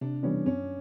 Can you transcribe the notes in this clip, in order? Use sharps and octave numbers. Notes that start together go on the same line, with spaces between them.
C3 D4
E3 G3 B3 C#4 D4
F#2 C#4